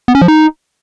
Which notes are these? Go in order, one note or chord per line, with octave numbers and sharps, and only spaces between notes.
B3
C#4
F3
D#4